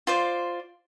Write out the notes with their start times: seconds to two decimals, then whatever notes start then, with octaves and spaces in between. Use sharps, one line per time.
0.07 F4 C5 D5